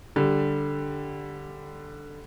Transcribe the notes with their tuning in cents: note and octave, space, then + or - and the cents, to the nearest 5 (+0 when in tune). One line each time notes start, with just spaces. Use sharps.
D3 +0 G3 +0